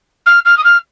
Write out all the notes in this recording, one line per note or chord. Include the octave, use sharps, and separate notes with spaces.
F6
F6
D#6
F6